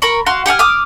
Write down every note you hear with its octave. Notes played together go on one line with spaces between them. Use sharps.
A#4 B5 C#6
F#4 F5 C6
G4 F#5 G#5 F6
D6 D#6 F6